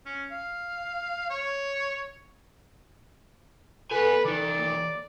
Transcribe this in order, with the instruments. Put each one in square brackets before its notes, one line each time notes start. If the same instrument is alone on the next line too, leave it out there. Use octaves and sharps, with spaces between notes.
[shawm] C#4
F5
C#5
[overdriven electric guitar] B3 G#5 [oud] A4 [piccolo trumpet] B4
[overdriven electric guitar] E3 D#4 [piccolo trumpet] D5
[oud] D#2